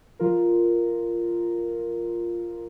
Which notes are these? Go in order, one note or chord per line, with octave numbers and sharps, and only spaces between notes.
F3 F4 A#4